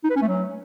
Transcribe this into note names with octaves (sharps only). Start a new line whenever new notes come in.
D#4
B4
C#4
A3
F#3